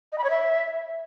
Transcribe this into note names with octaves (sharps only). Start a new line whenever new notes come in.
D#5
B5
C#5
E5